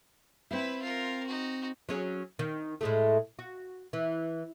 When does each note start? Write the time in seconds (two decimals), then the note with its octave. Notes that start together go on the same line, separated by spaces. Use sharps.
0.51 C4 E4 B4 E5
0.82 F4 A#4
1.26 D#4 F#4
1.89 F#3 C#4 G#4
2.39 D#3
2.81 A2 G#3 A3
3.39 F#4
3.93 E3